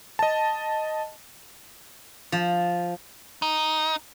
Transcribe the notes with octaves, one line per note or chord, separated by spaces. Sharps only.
D#5 A5
F3
D#4